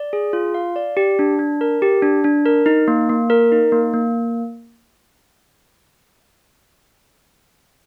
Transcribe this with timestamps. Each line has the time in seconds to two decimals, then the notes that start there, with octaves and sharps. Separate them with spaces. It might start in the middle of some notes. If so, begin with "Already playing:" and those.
Already playing: D5
0.13 G#4
0.33 F4
0.54 F5
0.76 D5
0.97 G4
1.19 D4
1.39 D4
1.61 A#4
1.82 G4
2.02 D4
2.24 D4
2.46 A#4
2.66 D#4
2.88 A#3
3.09 A#3
3.30 A#4
3.52 D#4
3.72 A#3
3.93 A#3